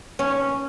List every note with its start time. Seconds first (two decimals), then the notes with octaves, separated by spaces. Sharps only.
0.19 C#4